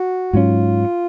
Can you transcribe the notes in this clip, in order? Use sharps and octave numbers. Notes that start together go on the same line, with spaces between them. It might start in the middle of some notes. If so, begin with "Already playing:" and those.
Already playing: F#4
G#2 F#3 C#4 F4